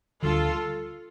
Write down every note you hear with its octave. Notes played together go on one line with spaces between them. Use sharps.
D2 D3 G3 D4 F4 A4